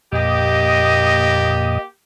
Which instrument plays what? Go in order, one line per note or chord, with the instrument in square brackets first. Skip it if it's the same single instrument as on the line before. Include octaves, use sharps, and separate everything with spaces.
[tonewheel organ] F2 A#2 D#6 [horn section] A#3 G4 [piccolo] D#5